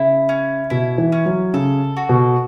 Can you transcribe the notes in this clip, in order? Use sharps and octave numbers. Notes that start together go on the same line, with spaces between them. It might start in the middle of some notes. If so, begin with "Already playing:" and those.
Already playing: C#3 E4
C#4
B2 E4
E3
C#4
F#3
C#3 A4
F#4
B2